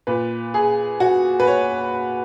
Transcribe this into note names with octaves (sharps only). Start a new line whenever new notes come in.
A#2 B4
G#4
F#4
B4
C#5